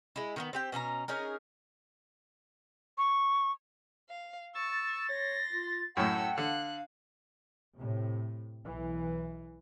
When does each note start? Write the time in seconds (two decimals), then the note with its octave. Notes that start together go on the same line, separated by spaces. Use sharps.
0.16 G#3 E4
0.36 D#3 A#3 B3
0.53 C4 G4 G5
0.72 B2 C#4 F4 A#5
1.08 C#4 D#4 G#4 A#4
2.98 C#6
4.09 F5
4.55 C#6 E6 A6
5.09 C#5 C6 A#6
5.52 F4
5.97 F#2 A2 A4 F#5 G5 E6
6.38 D3 F5 F#6
7.76 A2 C3
8.64 B1 E3